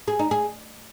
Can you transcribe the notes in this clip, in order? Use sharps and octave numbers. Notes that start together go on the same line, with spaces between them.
G#4
D#4
G#4